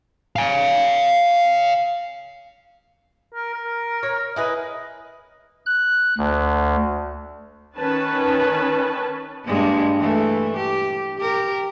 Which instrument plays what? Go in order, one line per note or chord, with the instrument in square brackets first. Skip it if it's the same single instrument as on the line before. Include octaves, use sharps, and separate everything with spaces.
[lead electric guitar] F5 G#5
[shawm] A#4
A#4
[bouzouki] C#5
[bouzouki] E4 G#4 B4 [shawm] D#5
[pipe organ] F#6
D2
[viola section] D#3 C#4 B4 A5
[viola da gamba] G2 G#3 A#3
E3 A3
G4
G4 A#4